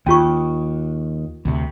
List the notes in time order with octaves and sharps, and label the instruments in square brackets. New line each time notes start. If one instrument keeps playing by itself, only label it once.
[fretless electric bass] D#2 [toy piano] C#4 F4 C#6
[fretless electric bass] D2 C3